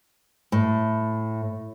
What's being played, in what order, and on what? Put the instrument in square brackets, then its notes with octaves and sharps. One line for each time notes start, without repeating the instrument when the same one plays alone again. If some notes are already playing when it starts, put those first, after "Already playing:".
[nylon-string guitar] A2